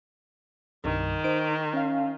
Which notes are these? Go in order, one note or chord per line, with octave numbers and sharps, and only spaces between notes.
C2 G2 D#3
D#4 C5 D7
C#4 F5